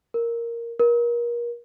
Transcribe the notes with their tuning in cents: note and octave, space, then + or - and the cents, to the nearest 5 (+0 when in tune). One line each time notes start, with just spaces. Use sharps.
A#4 +0
A#4 +30